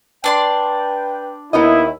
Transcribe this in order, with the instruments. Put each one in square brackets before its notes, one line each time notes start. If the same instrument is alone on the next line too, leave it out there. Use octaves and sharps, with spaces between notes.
[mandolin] D4 D5 C6 [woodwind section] B4 G5
[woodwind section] D#2 [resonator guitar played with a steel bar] B3 D#4 D#5 [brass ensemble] E4